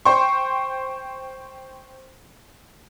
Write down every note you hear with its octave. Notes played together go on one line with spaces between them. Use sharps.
C5 G5 C6 C#6